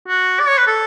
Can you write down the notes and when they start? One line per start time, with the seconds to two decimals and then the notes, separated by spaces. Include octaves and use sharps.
0.08 F#4
0.39 D5
0.48 C#5
0.58 B4
0.67 A4